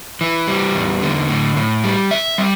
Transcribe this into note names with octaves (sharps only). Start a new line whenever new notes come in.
E3
G3
E2
D3
A2
A2
G3
E5
G3